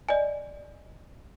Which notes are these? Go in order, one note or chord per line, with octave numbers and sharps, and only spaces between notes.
D5 D#5 G#5